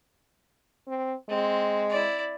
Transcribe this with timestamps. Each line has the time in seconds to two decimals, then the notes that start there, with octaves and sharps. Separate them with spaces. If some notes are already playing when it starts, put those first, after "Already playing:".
0.87 C4
1.29 G#3 C4
1.90 E4 D5